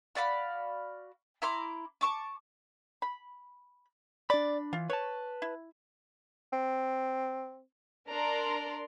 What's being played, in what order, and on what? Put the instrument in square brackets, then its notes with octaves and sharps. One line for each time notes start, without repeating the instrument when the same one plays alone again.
[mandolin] F#4 D5 F5 B5
E4 A#5 C6 D6
A5 C#6 D6
[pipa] B5
[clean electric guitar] D4 B5 [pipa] D5
[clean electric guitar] E3 [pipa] F4
[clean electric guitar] B4 A5 [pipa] C#5
[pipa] E4
[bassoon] C4
[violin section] D4 A#4 D5 A#5 C6